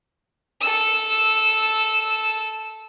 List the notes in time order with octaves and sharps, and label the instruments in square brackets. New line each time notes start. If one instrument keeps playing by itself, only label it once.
[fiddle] A4 E6